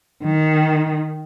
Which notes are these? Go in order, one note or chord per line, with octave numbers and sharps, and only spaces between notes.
D#3